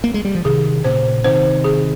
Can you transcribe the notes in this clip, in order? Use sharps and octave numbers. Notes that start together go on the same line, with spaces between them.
A#3
G#3
G3
F3
C3 D#3 G#4
A#2 C#3 C5
C3 D#3 C5
G#4